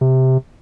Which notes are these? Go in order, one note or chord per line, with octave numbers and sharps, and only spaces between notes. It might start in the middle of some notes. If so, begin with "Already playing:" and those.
C3